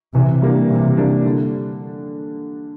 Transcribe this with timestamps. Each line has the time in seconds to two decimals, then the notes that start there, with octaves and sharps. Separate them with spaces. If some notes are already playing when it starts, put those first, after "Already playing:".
0.14 C3 E3
0.42 G3 A#3 D4
0.70 C3 E3
0.97 G3 A#3 D4
1.25 D3